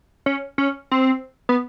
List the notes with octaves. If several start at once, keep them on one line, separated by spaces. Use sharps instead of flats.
C#4
C#4
C4
B3